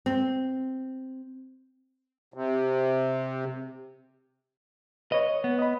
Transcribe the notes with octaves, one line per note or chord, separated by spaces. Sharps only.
C4
C3
B4 C#5 D#5
B3
D#5 B5